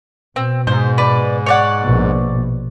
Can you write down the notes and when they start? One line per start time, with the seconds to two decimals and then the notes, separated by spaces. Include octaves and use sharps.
0.36 B2 C4
0.67 G#2 C5
0.98 B4 D5
1.46 C#5 D5 F#5
1.82 A#1 B2